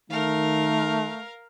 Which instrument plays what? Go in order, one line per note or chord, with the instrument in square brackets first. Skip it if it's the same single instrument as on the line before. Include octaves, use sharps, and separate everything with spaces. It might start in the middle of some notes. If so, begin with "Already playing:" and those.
[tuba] D#3 [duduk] A3 [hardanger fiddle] A#4 F5